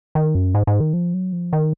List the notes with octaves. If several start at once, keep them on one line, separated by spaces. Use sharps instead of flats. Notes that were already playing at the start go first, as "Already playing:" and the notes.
D#3
F#2
G#2
G#2
D#3
F3
F#3
F3
D#3